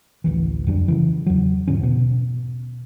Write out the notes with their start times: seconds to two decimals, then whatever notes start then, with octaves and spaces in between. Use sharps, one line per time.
0.24 A1 D2 E3
0.67 F2 G3 D4
0.88 C#3 E3
1.26 E2 F#3
1.68 E2 G#2 D3 C#4
1.83 B2